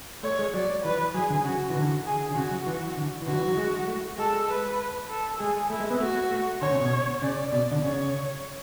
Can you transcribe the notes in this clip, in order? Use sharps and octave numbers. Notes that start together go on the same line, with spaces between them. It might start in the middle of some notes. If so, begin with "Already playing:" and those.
A3 C#5
G#3
F#3 D5
E3 B4
F#3 G#4
D3
C#3 F#4
E3
D3
G#4
D3
C#3 F#4
F#3
E3
D3
E3
D3 F#4
F#3
E3
F#3
G#3
A3
G#3 A4
B4
A4
G#3 G#4
A3 E4
G#3
B3
A3 F#4
A3
D3 C#5
C#3
B2
C#3 D5
B2 D5
D3
C#3 C#5